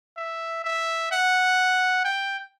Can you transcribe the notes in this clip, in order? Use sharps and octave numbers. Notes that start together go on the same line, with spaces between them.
E5
E5
F#5
G5